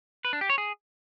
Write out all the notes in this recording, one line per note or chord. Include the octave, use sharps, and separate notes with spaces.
B4
D4
G4
C#5
G#4